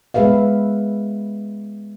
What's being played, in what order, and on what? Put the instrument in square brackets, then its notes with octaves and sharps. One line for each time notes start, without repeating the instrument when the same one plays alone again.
[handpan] G#3 B3 G#4 B4 E5 F5